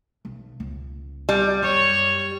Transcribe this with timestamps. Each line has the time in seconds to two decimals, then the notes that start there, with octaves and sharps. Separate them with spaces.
0.25 B1
0.60 C#2
1.29 G3
1.62 F#2 C#5